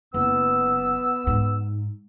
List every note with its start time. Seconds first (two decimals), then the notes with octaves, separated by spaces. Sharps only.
0.14 F#1 B3 E6
1.27 G#2